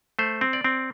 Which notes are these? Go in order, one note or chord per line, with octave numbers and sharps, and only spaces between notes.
A3 C5
C4
D5
C4